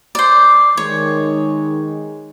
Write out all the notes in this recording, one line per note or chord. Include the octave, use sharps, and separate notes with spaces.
C5 D5
D#3 G#3 C#5